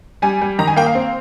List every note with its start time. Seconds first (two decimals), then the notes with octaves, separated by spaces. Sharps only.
0.22 G3 G#5
0.41 G3
0.59 D#3 A#5
0.67 G#5
0.76 A#3 G5
0.86 F5
0.95 C4